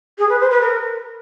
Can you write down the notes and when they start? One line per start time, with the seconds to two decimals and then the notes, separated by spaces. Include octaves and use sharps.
0.18 G#4
0.29 B4
0.40 C5
0.51 B4
0.61 A#4